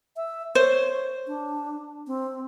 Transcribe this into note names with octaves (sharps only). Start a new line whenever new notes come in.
E5
C5 C#5
D4
C4